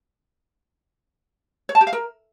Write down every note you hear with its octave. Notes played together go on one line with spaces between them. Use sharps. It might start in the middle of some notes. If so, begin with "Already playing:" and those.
C#5
A5
G4
F5
A#4